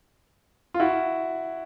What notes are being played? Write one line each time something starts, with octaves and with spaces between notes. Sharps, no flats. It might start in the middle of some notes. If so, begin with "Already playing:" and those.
F4
E4 F#4